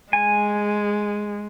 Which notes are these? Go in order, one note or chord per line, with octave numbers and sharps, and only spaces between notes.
G#3 G#5